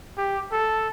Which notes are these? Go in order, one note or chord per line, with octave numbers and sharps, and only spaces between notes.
G4
A4